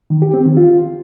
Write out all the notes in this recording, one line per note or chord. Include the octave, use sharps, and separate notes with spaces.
D#3
G4
C4
D#3
F4